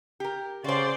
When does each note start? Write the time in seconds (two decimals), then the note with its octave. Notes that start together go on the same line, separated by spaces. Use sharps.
0.20 G4 A#4
0.64 C#3 F#4 C5 D5 C6